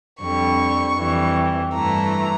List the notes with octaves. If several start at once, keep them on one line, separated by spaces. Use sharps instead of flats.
F2 D3 G3 C#6
F2 E3 G3
G2 E3 A3 A#5